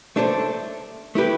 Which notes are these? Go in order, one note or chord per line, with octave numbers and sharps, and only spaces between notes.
A3 D4 A4 C5
A3 E4 G4 B4